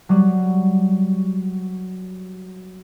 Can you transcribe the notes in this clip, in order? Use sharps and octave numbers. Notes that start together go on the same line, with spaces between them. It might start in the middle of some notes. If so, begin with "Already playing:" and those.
F#3 G3